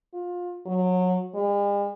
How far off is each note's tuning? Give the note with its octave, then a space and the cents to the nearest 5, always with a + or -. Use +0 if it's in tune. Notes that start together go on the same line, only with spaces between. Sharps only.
F4 +25
F#3 -20
G#3 -45